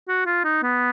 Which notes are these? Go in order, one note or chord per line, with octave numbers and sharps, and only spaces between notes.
F#4
F4
D#4
B3